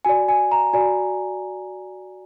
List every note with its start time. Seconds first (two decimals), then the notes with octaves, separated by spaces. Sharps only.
0.05 F#4 D5 G#5
0.29 G#5
0.52 A#5
0.73 F#4 D5 G#5